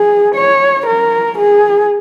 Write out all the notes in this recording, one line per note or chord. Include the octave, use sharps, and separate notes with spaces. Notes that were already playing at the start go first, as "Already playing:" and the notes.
Already playing: G#4
C#5
A#4
G#4